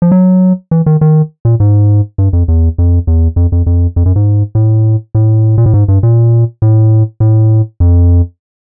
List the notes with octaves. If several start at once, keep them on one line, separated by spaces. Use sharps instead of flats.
F3
F#3
E3
D#3
D#3
A#2
G#2
G2
F2
E2
F2
E2
F2
F2
F2
F2
F#2
G#2
A2
A2
A#2
A2
G#2
G2
A#2
A2
A2
F2